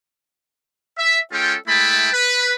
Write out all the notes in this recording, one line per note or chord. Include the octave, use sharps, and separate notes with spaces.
E5
G#3 C#4 F4 A4 G5
G#3 A3 E4 G5 A5 B5
B4